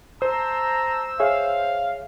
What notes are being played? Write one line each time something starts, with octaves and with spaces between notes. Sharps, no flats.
C5 A5 A#5 E6
G#4 C#5 E5 F5